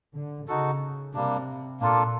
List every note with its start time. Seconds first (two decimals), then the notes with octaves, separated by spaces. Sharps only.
0.14 D3
0.48 C#3 D#4 F#4 A4
1.14 C3 G3 A#3 D4
1.80 A#2 A#3 D4 F4 A4